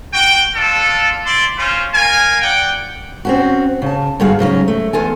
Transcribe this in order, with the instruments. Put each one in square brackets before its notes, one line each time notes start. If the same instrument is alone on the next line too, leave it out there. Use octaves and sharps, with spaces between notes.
[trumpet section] F#4 G5
D4 F4 A4
E4 D5 C6
C#4 F4 C5
A#4 F5 G#5
D5 F#5 G5
[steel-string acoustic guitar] C4 C#4 F#4
C#3 A5
G2 D3 G3 F#4 G#4 F5
G#2 C#3 F#3 C#4
A3
E2 F4 A4 G#5